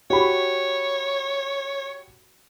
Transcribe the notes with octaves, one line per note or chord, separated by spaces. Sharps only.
F#4 G4 C#5 B5